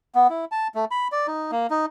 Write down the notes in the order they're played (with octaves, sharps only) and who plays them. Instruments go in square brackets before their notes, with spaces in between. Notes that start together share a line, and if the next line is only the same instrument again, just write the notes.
[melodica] B3
E4
A5
A3
B5
D5
D#4
A#3
D#4